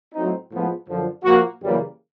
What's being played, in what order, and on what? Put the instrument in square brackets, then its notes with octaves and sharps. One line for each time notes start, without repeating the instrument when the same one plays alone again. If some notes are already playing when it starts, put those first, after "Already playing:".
[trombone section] A2 F#3 A3 C4 D#4
A2 F3 G#3 B3
F#2 D3 F3
A#2 F3 A#3 F#4
F#2 C#3 E3 G3 A#3